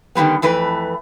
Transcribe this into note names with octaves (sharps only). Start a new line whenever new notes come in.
D3 D#3 F3 G3 B3
F2 E3 A3 B4